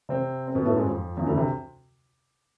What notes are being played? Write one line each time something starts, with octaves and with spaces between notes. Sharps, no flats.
C3 C4
C4
B2 B3
A2 A3
G#2 G#3
F2 F3
E2 E3
D2 D3
C3